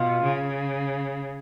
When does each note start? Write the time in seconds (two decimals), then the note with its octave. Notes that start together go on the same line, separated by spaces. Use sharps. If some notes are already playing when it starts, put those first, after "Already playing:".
Already playing: B2 F4
0.23 C#3